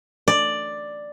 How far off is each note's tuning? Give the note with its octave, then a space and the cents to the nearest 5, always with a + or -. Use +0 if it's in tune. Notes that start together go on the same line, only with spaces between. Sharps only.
D5 +5